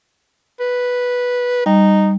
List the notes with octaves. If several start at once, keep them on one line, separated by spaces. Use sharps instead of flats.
B4
G3 D#4